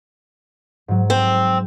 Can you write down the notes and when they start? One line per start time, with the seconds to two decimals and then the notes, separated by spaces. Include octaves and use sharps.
0.88 G#2 F#3
1.10 C4